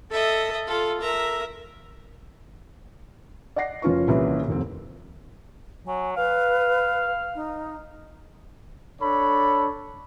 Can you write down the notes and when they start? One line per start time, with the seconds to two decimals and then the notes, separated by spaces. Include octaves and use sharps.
0.11 A4 D#5 E5
0.67 F4 A4
1.01 A#4 E5 A#5
3.56 D5 D#5 F#5 A#6 C7
3.82 F#1 F3 C#4 F4 B4 C#6
4.08 C2 A#2 C#3 E3 B4 C#5
4.48 F1 D#2 C4
5.87 F#3 G#5
6.17 B4 F5
7.35 D#4
9.01 D4 A4 C#5 B5